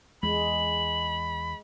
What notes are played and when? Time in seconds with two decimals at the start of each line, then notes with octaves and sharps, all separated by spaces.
0.23 E2 G#3 B5 F#7